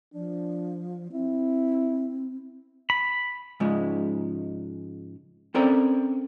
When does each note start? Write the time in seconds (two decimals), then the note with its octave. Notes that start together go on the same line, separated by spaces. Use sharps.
0.14 F3 D4
1.13 C4 E4
2.90 B5
3.60 G#2 C#3 F3 G#3
5.54 C4 C#4 A4 A#4 C5 D5